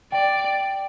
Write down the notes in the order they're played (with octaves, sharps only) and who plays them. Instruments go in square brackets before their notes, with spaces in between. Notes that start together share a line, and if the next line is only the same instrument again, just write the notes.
[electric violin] D5 [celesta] G5